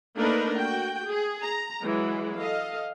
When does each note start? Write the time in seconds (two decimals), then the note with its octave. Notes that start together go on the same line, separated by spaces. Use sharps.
0.16 A3 A#3 D4 D#4 A#4 B4
0.55 F#4 G5
1.05 G#4
1.41 A#5
1.83 E3 F#3 G#3
2.39 A4 D#5 F5